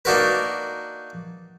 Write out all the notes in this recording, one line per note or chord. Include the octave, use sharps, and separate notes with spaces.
A#3 D4 D#4 F#4 A#4 B4